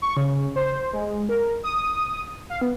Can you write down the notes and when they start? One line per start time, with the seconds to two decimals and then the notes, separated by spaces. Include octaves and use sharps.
0.02 C#6
0.17 C#3
0.56 C5
0.94 G#3
1.29 A#4
1.64 D#6
2.50 F5
2.62 B3